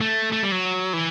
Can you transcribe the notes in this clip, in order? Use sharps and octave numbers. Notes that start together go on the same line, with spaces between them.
A3
A3
G3
F#3
E3